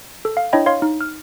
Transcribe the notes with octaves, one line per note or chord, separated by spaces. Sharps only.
A4
F5
D4 E4 C#5 D#5 G5 B5
C#5 F5 C6
D#4
F6